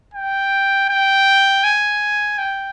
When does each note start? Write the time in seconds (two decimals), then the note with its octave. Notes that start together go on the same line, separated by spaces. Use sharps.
0.14 G5
0.89 G5
1.64 G#5
2.38 G5